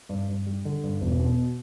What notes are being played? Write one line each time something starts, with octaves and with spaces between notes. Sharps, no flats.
G2
G2
G3
D3
G2
E1
B2